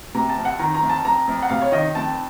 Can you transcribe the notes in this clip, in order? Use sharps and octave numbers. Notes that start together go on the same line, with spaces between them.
C3 A#5
A5
F2
F#5
D#3 A#5
A#5
F2
A5
F2 A#5
F2
F#5
C3 F5
C#5
D#3 D#5
F2 A5